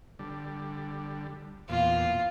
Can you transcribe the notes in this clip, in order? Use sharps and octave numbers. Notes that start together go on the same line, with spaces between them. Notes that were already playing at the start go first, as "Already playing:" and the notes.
D3 G3
E2 A#2 F4